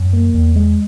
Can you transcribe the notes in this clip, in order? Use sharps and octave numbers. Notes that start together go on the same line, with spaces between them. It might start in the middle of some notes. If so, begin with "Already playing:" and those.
Already playing: F#2
A#3
E2
G#3